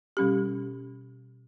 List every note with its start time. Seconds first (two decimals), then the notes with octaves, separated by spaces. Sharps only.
0.17 B2 G3 C#4 G4